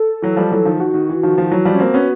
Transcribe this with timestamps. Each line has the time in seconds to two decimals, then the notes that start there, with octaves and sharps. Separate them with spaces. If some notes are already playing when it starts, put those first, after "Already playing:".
Already playing: A4
0.22 E3 F#3
0.37 F3 G3
0.52 E3 F#3
0.65 D#3 F3
0.80 D#3 F#4
0.94 D#3
1.09 E3
1.23 D#3 F3
1.38 D#3 F3
1.51 E3 F#3
1.65 F3 G3
1.74 C#4
1.80 A#3 C4
1.94 B3 C#4